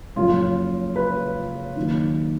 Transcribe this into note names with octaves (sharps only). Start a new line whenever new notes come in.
F#1 F#2 C#3 F3 F4
B4
D#2 D#3 F#3